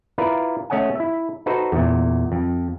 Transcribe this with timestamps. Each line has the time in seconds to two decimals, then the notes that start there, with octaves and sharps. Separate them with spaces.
0.18 E4 F4 A#4 B4 D5
0.70 A3 C#4 C#5 D#5 F#5 G#5
0.95 E4 E5
1.46 D#4 F#4 A4 B4 C5
1.72 E2 A#2
2.32 F2